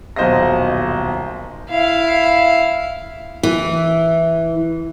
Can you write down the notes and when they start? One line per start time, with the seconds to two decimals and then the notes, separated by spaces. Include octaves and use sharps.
0.16 D#1 B1 C5 D#5 F5 A#6
1.70 E4 F5
3.43 E3